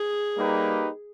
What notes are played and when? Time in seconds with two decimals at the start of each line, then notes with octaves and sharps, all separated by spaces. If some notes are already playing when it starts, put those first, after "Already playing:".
Already playing: G#4
0.36 G3 A#3 D#4 G4 B4